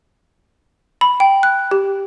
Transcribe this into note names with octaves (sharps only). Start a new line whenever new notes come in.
B5
G5
F#6
G4